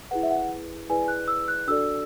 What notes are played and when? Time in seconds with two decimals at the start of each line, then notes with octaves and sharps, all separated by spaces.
0.11 E4 G#4 B4 F#5
0.23 E5
0.31 F#5
0.90 E4 G#4 B4 D5 G#5
1.08 F#6
1.28 E6
1.48 F#6
1.68 D4 F#4 A4 D5 E6